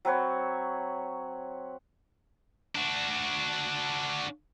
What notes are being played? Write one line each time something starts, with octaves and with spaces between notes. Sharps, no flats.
F#3 C4 B4 C#5
D4 F#4